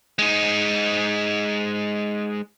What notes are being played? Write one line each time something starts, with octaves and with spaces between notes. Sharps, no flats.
G#3 D#4